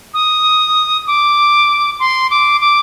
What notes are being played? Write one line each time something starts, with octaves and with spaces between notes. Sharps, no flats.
D#6
D6
C6
D6
D6